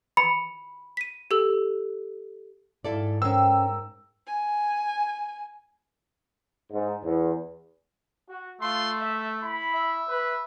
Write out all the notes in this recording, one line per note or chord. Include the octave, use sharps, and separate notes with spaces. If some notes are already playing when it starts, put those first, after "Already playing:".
B5 C#7
B6 D#7
G4 A4 E6
G#2 E4 A4 D5 F5 E6
C#4 A#4 C5 G5 A#5 E6
G#5
G#2
E2
F#4
A3 F4 F5 C6
E5
E4 B5
E5
B4